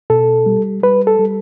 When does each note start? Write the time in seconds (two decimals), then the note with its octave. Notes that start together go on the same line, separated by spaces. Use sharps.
0.10 B2 A4
0.46 G3
0.83 G3 B4
1.07 A4
1.19 G3